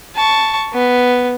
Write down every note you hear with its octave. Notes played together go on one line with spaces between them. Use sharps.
A5 C#6
B3